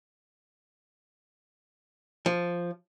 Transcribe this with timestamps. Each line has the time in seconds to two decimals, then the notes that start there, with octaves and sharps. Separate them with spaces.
2.26 F3